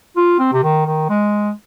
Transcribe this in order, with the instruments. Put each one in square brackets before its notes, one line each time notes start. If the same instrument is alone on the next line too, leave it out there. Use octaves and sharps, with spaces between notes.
[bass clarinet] F4
C4
C3
D#3
D#3
G#3